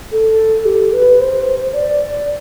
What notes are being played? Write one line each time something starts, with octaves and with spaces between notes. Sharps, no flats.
A4
G4
B4
C5
D5